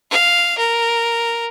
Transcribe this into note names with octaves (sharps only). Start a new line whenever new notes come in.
F5
A#4